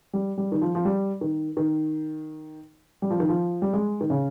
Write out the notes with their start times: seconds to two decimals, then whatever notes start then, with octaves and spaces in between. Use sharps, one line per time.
0.13 G3
0.38 G3
0.52 D#3
0.62 F3
0.75 F3
0.85 G3
1.21 D#3
1.57 D#3
3.02 G3
3.10 F3
3.20 D#3
3.29 F3
3.62 G3
3.73 G#3
4.01 D#3
4.10 C#3